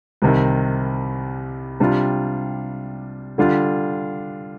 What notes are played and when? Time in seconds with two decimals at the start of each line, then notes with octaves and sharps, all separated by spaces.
0.22 C2 C3 D#3
1.80 C3 G3 D4 F4
3.38 D3 G3 D4 F4